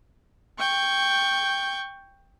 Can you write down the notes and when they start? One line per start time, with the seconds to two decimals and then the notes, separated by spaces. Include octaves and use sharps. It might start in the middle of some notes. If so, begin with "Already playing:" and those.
0.59 G5 C#6